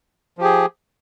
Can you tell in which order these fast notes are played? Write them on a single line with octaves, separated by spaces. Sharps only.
F3 G4 G#4